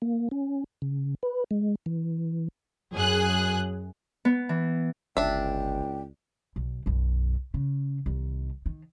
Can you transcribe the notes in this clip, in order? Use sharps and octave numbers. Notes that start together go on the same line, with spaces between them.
A#3
C#4
C#3
B4
G#3
E3
F#2 G#4 F#6
B3
E3
G1 C#2 D4 E5 G5
B1
B1 F#2
C#3
C2 D#3
D#3